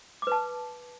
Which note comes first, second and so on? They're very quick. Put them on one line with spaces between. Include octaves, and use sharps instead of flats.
D6 B4 A5